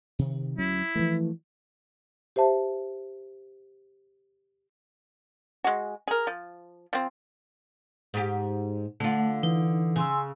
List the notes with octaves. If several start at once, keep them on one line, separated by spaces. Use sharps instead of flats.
C3 D#3
D2 F#3 C#4 E4
E3 F3 A3
G4 C5 E5 A5
G#3 F#4
G#4 A#4
F3
F3 C4
G#2 G4
D3 A3 F4 F#5
E3 D#4
C#3 G#5 C6 E6